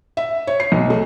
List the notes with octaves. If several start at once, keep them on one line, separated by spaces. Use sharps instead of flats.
E5
C#5
C7
B1
A3